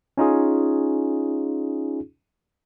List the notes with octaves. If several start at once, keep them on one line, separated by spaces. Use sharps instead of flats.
C#4 D#4 F4 G#4